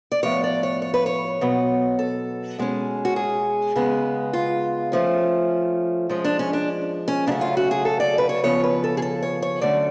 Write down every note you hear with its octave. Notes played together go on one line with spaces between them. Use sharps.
D5
A2 F3 B3 C#5
D5
C#5
C#5
B4
C#5
B2 F#3 B3
A4
B2 G#3 C#4
F#4
G#4
C#3 G#3 B3
F4
F3 A3 C#4
F3 G#3 C#4
D4
C#4
D4
C#4
C#3 F#3 A3 C#4 D4
F4
F#4
G#4
A4
D5
B4
C#5
C#3 F3 B3 C#5
B4
A4
G#4
A4
C#5
C#5
D3 F#3 A3 C#4 D5